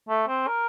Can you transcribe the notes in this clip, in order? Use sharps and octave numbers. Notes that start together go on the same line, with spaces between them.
A3
C4
A#4